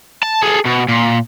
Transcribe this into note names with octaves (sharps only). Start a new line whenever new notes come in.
A5
G#4 A4
B2
A#2